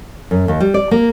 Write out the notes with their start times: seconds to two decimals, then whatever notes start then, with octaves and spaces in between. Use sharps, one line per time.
0.31 F#2
0.48 D#2
0.60 G3
0.74 D5
0.91 A#3